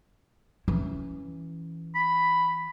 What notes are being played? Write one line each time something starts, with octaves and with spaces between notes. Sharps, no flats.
E3 C#4
B5